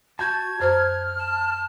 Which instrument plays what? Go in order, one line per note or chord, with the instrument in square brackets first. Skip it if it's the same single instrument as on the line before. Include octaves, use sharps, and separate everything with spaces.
[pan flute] F#4 [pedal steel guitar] A5 G6 [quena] G#6
[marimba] F#2 C5 [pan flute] F6
[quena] A5